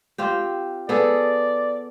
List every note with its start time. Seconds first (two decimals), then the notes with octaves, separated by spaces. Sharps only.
0.18 C4 F4 G4
0.89 B3 G#4 A4 D5